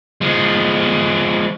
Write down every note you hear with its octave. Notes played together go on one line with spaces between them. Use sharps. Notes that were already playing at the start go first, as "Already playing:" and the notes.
F3 G#3